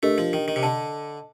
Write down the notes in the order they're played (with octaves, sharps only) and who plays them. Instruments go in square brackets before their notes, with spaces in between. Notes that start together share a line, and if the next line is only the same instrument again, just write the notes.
[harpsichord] A3 [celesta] D4 G4 A#4 D#5
[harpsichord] F3
D#3
D#3
C3
[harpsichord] D3 [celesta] A4 D#5 A5